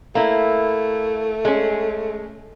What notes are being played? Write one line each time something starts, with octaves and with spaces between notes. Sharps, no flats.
A3 A#3 E4
G#3 C#4